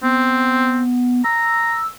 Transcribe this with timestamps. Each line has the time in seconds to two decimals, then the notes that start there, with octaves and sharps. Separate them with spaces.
0.03 B3 C4
1.24 A#5 E6